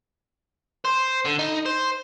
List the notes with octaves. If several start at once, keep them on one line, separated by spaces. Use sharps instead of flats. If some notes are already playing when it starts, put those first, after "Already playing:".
C5
D3
D#4
C5